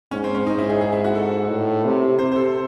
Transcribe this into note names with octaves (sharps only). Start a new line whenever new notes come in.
G#2 C#4
C4
C#4
G#2 D#4
E4
G#4
G#4
E4
F#4
G#2 A4
A2
C3
C3 C5
C5
A4